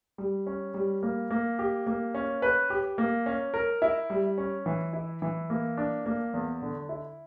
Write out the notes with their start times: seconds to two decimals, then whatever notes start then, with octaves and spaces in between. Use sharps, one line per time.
0.18 G3
0.47 C#4
0.74 G3
1.03 A#3
1.30 A#3
1.59 G4
1.86 A#3
2.14 C#4
2.42 B4
2.70 G4
2.98 A#3
3.26 C#4
3.54 A#4
3.82 E4
4.10 G3
4.38 C#4
4.66 E3
4.93 E4
5.22 E3
5.50 A#3
5.77 D4
6.06 A#3
6.33 E2
6.62 D3
6.89 E4